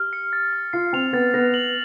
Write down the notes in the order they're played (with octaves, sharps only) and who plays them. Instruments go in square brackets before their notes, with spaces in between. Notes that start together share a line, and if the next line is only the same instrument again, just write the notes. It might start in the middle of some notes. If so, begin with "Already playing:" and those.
Already playing: [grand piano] G4 [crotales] F6
[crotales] C#7
A6
A6
[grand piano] F4 [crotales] C7
[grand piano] C4 [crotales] F7
[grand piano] B3 [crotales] A6
[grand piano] B3 [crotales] A#6
[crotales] F#7